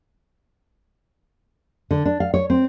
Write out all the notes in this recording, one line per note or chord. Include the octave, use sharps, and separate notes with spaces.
D3
D4
F5
C#5
C4